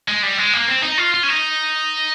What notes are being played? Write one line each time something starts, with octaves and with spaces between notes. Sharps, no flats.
G#3
G3
G#3
A#3
C4
D#4
F4
F4
C#4
D#4